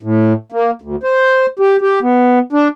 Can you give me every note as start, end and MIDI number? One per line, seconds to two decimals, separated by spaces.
0.03 0.33 45
0.52 0.71 58
0.82 0.96 38
1.03 1.46 72
1.59 1.76 67
1.81 1.99 67
2.02 2.39 59
2.53 2.68 62